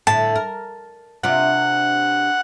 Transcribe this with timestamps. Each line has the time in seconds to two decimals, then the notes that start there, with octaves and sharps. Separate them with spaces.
0.07 A2 D3 A5
0.36 A#4
1.24 C3 D4 F4 F#5